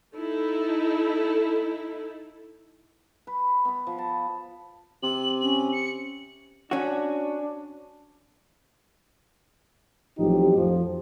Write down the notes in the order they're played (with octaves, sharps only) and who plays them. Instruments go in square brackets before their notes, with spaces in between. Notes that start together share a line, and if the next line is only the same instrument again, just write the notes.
[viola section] D#4 E4 A4
[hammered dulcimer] B4
B3 B5
F3
A5
[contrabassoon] C3 [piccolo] F#7
[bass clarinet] C#4 [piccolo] F#7
[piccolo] C#7
[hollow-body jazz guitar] C#4 F#4 [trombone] D4
[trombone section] A1 F3 F#3 C4 D#4 G4
F2 F3